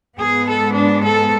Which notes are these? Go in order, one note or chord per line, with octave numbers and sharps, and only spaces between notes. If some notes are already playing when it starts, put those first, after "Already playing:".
G#2 G#3 B3 G#4
A4
D4
A4